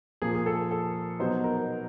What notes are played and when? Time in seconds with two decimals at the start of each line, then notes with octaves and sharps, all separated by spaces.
0.22 A#2 F3 A#3 G#4
0.35 G#4
0.46 A4
0.71 A4
1.19 B2 F#3 B3 D#4 C5
1.44 A#4